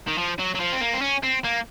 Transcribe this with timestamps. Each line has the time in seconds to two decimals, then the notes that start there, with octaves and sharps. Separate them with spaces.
0.08 D#3
0.18 F3
0.39 F#3
0.55 F#3
0.60 F3
0.73 C4
0.81 A#3
0.94 C4
1.02 C#4
1.23 C4
1.44 A#3